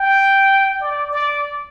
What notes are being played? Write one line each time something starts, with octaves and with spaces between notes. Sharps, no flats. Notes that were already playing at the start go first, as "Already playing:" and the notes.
Already playing: G5
D5
D5